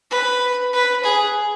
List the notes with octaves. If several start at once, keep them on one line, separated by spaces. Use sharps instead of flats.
B4
B4
G#4